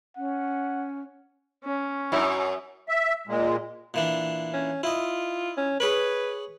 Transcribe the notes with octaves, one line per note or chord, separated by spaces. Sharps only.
C#4 F#5
C#4
F#2 F#3 D#4 E4
E5
A#2 G#3
A#2 E3 D4
C#4
E4 F4 D#5
C#4
G#4 B4 C#5 B5